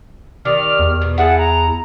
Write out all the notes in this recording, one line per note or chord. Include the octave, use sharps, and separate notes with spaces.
D#3 G4 D5 F6
E2
B2
E4 G#4 F#5 A5
A#5